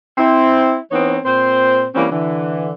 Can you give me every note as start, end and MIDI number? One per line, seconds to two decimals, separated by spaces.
0.18 0.77 60
0.18 0.77 64
0.92 1.18 52
0.92 1.18 59
0.92 1.18 60
0.92 1.18 63
0.92 1.18 73
1.26 1.86 46
1.26 1.86 60
1.26 1.86 72
1.94 2.07 52
1.94 2.07 55
1.94 2.07 58
1.94 2.07 60
1.94 2.07 61
2.11 2.73 50
2.11 2.73 52